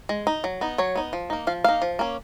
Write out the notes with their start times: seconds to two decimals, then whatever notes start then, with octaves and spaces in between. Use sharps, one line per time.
0.09 G#3
0.27 D#4
0.44 F#3
0.61 B3 D#4
0.78 F#3 C#5
0.95 B3 D#4
1.13 F3
1.30 A#3 D#4
1.47 F3 F5
1.64 A#3 D#4 F5
1.82 F3
1.99 A#3 C#4